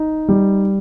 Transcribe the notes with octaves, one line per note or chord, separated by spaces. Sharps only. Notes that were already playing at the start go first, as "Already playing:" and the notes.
Already playing: D#4
G3